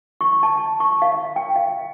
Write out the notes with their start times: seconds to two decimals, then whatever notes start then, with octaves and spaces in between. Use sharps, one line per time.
0.21 C#6
0.43 A5
0.80 C#6
1.02 F5
1.36 G5
1.56 F5